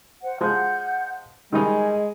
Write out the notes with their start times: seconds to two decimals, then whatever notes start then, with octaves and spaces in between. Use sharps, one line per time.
0.22 C5 F#5
0.41 F3 G#3 F#5 G6
1.52 D#3 G3 G#3 D#4 G#5